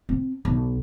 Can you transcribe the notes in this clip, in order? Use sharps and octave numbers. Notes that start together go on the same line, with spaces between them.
C4
B1